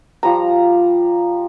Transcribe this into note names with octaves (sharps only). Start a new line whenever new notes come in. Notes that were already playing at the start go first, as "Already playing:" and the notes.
F3 G3 A#5